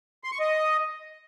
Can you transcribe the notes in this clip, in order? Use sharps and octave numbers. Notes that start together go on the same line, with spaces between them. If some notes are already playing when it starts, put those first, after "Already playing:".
C6
C#6
D#5